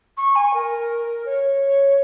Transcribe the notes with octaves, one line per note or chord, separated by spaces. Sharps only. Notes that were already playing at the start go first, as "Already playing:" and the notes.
C#6
G#5
A#4
C#5